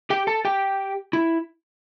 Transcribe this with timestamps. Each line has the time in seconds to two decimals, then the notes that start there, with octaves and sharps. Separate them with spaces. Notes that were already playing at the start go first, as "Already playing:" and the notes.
0.10 G4 G5
0.27 A4 A5
0.45 G4 G5
1.13 E4